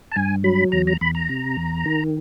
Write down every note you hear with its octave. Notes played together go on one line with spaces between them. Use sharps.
A5
G2 G#5
F#3 B5
E2 A#5
A#5
E2 B5
A#5
C3
E2
D#3